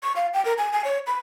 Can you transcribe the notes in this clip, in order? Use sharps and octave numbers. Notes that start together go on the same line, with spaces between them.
C#6
F5
G5
A#4
G#5
G#5
C#5
B5